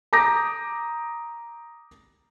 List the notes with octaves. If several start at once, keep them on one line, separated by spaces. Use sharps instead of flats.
A#5 D6 D#6 G6 A#6